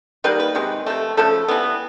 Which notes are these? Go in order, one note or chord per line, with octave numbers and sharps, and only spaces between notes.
D#3 G3 A#3 B4
B4
C3 D#3 G#3
C3 F3 A3
C#3 F3 A3 A4
E3 G3 B3